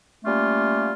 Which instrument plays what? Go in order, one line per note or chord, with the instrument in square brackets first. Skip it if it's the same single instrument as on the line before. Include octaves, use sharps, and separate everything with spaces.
[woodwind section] G3 A3 A#3 C#4 F4